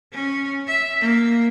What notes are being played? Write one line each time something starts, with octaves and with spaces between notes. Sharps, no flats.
C#4
E5
A#3